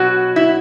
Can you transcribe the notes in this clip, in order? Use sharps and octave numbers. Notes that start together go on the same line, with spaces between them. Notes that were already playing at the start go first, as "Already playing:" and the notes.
Already playing: B2 F#3 F#4
E4